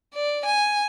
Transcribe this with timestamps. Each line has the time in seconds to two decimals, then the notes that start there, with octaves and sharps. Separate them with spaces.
0.14 D5
0.46 G#5